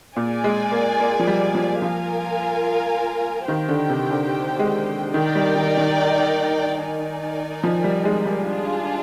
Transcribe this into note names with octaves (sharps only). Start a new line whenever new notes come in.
A#2 G#4 D5 G#5
G#3
A#3
A#3
F3
G3
F3
F3 F4 A#4 F5 G#5
D#3 G4 C5 G5
D3
C3
D3
G#3
D#3 D#4 A#4 D5 G5
G3
D#3
D#3
D#4 A#4 D5 G#5
F3
G3
G#3
G3
D4 F4 G#4